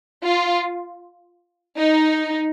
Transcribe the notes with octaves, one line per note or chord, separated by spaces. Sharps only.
F4
D#4